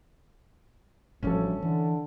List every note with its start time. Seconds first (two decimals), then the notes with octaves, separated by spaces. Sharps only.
1.23 A1 D2 F3 G3 C#4 A4
1.62 D3 E3